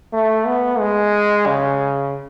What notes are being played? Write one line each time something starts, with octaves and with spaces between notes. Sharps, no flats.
A3
B3
G#3
C#3